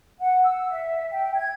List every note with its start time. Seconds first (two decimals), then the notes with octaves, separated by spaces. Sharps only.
0.19 F#5
0.43 E6
0.69 E5
1.12 G5
1.35 G#6